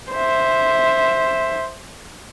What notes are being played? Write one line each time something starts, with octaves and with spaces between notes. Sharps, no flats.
C5 E5